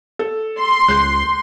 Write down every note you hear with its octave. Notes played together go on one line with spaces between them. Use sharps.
A4
C6
C#2 F#6 G6